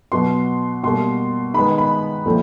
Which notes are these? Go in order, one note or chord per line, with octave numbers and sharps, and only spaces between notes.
B2 F#3 B3 C6
B2 G3 A#3 C6
D#3 G#3 B3 B5
B5
A#2 F3 A3 C4